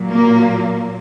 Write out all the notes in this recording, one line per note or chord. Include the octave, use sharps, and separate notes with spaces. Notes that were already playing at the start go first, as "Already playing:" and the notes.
Already playing: A#2 F#3
A#3